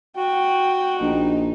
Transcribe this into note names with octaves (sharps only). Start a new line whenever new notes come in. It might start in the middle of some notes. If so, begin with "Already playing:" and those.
F#4 G5
A#1 D#4